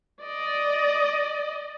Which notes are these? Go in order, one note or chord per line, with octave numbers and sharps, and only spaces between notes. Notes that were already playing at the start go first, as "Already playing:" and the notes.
D5 D#5